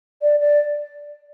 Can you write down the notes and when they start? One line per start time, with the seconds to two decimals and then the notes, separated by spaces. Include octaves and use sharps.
0.22 D5
0.40 D5